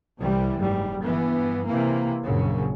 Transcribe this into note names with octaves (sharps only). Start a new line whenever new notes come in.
C2 C3 E3 G3
F#1 G#2 G3
G2 E3 B3
C3 E3 A#3
A#1 F#2 C#3